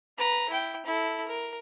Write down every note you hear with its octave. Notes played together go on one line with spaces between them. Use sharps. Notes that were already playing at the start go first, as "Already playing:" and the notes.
B4 A#5
E4 G5
E4 A4
A#4